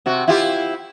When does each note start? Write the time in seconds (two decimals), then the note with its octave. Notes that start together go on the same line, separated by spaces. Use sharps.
0.06 C3 F#4
0.28 E4 F4 G4